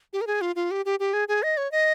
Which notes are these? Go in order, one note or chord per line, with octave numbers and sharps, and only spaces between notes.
G4
A#4
G#4
F4
F4
G4
G4
G4
G#4
G#4
D#5
C#5
D#5